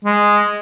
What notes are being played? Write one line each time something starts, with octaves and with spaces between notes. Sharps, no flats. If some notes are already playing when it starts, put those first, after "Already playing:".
G#3